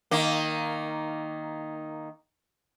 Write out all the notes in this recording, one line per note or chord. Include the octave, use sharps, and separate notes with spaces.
D#3 A#3